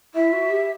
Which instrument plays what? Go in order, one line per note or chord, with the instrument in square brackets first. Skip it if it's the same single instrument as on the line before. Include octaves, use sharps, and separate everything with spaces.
[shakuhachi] E4 [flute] E5
[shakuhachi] F#4
G4